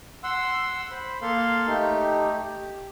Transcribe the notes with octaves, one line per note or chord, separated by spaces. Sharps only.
F#5 C6 E6
C5 B5
A#3 A4 F5 C6
A3 D#4 G4
G4